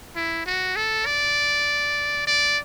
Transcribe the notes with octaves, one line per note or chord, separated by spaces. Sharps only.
E4
F#4
A4
D5
D5